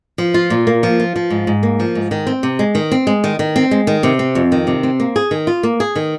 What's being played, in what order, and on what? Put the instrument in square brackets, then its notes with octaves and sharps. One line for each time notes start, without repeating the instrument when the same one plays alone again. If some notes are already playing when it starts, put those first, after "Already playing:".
[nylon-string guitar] F3
F4
A#2
A#3
F3
F4
F3
G#2
G#2
A#3
F3
G#2
D#3
C4
C3
G#3
D#3
C4
G#3
D#3
D#3
C4
G#3
D#3
C3
C4
F2
D#3
C3
C4
A#3
G#4
D#3
F4
A#3
G#4
D#3